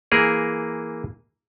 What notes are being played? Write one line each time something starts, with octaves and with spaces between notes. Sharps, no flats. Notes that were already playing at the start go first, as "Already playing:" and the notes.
E3 A#3 G#4 A#4